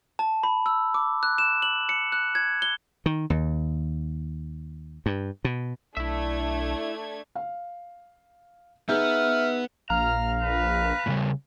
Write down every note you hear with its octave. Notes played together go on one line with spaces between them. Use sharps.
A5
B5
E6
D6
F#6
E7
F#7
C#7
F#6
G#6
G7
D#3
D#2
G2
B2
B1 A3 D4 E4 E5 G#6
F5
B3 D#4 G#4 E5 F6 G6
A#1 F5 A#5 F6
B4
A2 C#3 G3